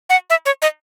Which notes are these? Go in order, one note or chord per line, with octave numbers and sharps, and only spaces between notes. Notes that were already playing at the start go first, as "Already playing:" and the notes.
F#5
E5
C#5
D#5